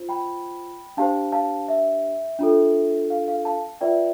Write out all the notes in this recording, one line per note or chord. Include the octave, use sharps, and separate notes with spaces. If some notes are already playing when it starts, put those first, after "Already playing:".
Already playing: F4 C5
G5 B5
D4 G4 C5 F5 A5
F5 A5
E5
D4 F4 A4
F5
F5
F5 A5
F4 B4 D5 E5 G5